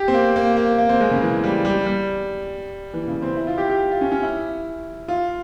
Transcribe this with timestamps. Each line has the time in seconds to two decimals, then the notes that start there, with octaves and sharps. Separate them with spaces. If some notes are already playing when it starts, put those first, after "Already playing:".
Already playing: G4
0.08 C4
0.14 A#3
0.36 A#3
0.57 A#3
0.78 A#3
0.89 C4
1.00 G#3
1.11 C#3
1.22 E3
1.44 G3
1.65 G3
1.86 G3
2.94 E3
3.08 C#3
3.22 C4
3.37 E4
3.47 F4
3.58 G4
3.70 G4
3.91 F4
4.01 C#4
4.12 C#4
4.23 E4
5.08 F4